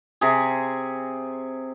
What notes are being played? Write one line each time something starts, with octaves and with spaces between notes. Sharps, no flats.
C3 G#4